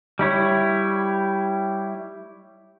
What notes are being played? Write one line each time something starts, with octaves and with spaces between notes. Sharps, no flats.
G3 E4 C#5